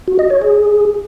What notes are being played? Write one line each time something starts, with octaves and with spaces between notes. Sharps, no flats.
F#4
D#5
C#5
G#4